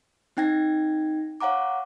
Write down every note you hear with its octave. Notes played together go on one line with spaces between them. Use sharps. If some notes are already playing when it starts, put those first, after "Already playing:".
C4 D#4 G5 G#6 A#6
C#5 F5 F#5 A#5 D6